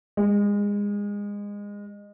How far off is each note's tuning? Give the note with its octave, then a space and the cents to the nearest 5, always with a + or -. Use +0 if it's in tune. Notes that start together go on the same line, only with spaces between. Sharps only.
G#3 -25